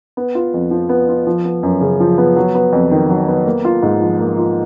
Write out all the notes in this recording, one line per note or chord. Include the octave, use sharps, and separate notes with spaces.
B3
F4
F2
F3
B3
F4
F3
B3
F#2
C#3
F3
B3
F#3
B3
F2
D#3
F#3
B3
A#3
F4
G#2
F3
A#3
F4